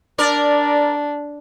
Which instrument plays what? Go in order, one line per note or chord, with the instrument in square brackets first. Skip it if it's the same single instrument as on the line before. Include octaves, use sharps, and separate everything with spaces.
[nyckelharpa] D4 [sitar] A#4 D5